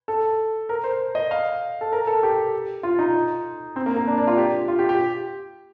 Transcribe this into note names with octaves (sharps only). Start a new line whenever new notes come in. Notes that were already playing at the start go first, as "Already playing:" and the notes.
A4
A#4
C5
D#5
F5
A4
A#4
A4
G4
F4
D#4
C4
A#3
A#3
D4
D4
F4
G4
F4
G4
G4